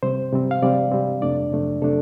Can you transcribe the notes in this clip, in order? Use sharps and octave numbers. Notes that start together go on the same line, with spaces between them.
C3 G3 C4 C5
C3 G3 C4
F5
C3 G3 C4 D5
C3 G3 C4
F2 C3 A3 D4 D5
F2 C3 A3 D4
C3 A3 D4 A4